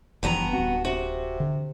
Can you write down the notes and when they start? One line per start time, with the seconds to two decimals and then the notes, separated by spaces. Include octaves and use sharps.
0.23 F#1 G2 E3 F3 B3 A#5
0.53 D1 C4 F#4
0.85 C3 F#4
1.40 D3